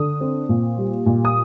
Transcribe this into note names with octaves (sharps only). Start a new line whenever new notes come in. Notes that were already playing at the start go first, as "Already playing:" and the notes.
Already playing: D3 D#6
C4
A#2
G3
A#2
D#6